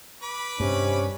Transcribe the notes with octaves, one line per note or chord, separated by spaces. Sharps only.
B4 B5 D6
G2 C3 C#4